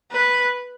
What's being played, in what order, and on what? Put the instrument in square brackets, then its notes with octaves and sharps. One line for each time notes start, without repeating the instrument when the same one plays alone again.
[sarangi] B4